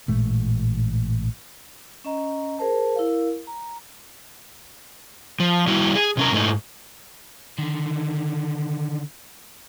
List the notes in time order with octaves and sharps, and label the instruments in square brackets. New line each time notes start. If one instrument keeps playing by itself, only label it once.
[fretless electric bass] A1 A#2 G#3 A3
[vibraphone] C#4 D#5 A#5
G#4 A#4 C5 A5
E4 A#4 F5
A#5
[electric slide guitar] F3
G3 E4 F#4
G#4
C3 C#4 A#4
G#2 A3 D#4
[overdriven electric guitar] D3 D#3